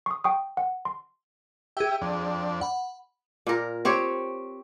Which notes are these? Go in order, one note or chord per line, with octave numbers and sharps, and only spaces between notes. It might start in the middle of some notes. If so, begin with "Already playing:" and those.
C#6 D#6
G5 C#6 D#6
F#5
C6
G4 G#4 E5 G5
F2 D4
F#5 B5
A#2 A#4
C4 G4 C#5